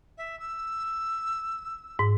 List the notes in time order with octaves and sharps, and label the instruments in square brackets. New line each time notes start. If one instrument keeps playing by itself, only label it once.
[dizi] E5
E6
[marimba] G#2